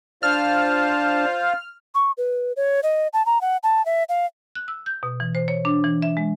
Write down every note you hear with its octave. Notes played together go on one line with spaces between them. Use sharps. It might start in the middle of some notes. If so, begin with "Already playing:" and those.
D4 F4 C5 F5 A5 F6
C#6
B4
C#5
D#5
A5
A#5
F#5
A5
E5
F5
F#6
E6
G6
B2
E3
C5
C#5
D4
E3
E5
G#3